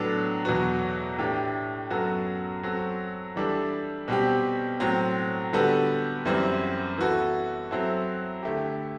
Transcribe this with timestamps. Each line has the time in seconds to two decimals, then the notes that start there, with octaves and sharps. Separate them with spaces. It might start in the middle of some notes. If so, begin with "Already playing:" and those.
Already playing: A2 F#3 B3 D4 A4
0.45 E2 B2 F#3 B3 F#4
1.18 A2 E3 A3 D4 G4
1.90 F#2 F#3 B3 F#4 A4
2.63 F#3 C4 F#4 A4
3.36 E3 G3 D4 A4
4.08 B2 G3 C4 G4
4.80 A2 F#3 C4
5.53 D3 G3 B3 F#4 A4
6.25 F#2 E3 G3 C4
6.98 E3 B3 F#4 A4
7.71 F#3 C4 E4 A4
8.43 D3 A3 E4 G4